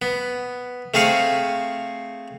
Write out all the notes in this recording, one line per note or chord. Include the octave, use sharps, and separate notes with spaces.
B3
A3 C4 G#4 F5 C#6